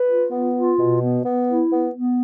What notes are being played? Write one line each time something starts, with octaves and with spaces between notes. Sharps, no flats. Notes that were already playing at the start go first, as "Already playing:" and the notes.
Already playing: B4
F4
B3
F4
B2
B3
B3
E4
B3
B3